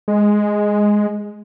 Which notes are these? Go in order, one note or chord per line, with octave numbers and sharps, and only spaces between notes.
G#3